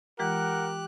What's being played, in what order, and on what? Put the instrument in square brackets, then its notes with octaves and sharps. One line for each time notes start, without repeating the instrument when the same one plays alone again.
[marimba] E3 G#3 F4 [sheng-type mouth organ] G4 F#6 [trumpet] A#4 [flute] F#5